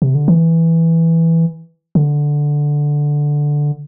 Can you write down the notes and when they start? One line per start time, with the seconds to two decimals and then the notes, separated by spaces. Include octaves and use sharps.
0.02 C3
0.15 D3
0.28 E3
1.95 D3